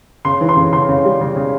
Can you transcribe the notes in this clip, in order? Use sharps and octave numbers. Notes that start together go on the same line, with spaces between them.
C#3 C6
E3
C6
C#3
C#3 C6
C#3
G3
C#3
C#3